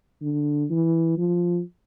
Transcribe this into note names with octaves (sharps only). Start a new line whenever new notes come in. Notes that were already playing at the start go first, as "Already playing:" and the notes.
D3
E3
F3